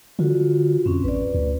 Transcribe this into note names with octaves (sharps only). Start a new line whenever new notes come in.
D3 F4 F#4
F2 C4 C#4
A1 B4 D5
D2